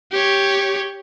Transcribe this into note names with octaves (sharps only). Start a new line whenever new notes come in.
G4 C#5